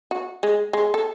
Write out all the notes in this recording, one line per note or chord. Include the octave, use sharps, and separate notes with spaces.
F#4
G#3
G#3
A4